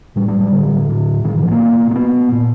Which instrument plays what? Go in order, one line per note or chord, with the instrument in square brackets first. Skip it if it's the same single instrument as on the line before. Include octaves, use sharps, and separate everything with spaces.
[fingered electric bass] A2 G3
G3
G3
A2 D3
A2
A2 D#3
E3
F3
A#3
B2
A#3
B2 B3
A#2